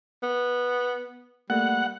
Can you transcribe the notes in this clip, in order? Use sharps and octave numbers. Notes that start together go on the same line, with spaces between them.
B3
G3 A3 A#3 F#5